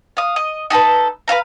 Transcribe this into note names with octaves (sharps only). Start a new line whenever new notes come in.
F5 D#6
D#5
D#4 G4 A4 B4
B4 C#5 F5 A#5